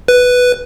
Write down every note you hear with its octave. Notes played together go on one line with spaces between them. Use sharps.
B4